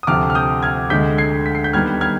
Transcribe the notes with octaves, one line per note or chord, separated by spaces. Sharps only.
D#6
D2 C3 F3 D6 F6
F6
D#6 G6
F6 G#6
D2 D3 G#3 G6 B6
G#6 C7
B6
C7
G6 B6
D#2 D#3 G3 B3 F6 G#6
F6 G#6